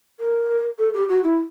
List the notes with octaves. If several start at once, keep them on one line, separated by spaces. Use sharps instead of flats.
A#4
A4
G4
F#4
E4